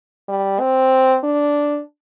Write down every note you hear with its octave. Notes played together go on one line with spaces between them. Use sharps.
G3
C4
D4